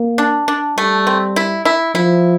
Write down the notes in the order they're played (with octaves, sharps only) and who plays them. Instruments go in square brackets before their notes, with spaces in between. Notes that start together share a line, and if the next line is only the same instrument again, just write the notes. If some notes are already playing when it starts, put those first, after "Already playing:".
Already playing: [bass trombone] A#3
[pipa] D4
D4
[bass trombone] G3 [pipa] A3
[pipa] C4
E4
E4
[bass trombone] F3 [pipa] E4